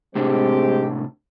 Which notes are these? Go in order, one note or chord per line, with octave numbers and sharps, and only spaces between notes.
A2 C3 G#3 C4 D4 G4